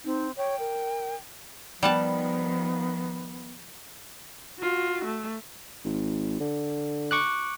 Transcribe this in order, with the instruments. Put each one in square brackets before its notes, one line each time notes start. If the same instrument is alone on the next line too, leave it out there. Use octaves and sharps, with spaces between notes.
[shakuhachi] C4 [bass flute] D#4
[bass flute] C#5 [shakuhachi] G5
[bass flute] A#4
[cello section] D#3 F3 [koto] G3 F#5 A5 [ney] B3
[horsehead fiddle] F4 F#4
A3
[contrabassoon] G#1
D3
[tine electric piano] C#6 D6 F#6